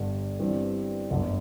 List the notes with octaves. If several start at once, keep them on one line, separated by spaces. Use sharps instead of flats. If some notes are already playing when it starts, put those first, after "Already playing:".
Already playing: G1 G2 D3
G2 E3 G3 C4
G1 F#2 D3 A3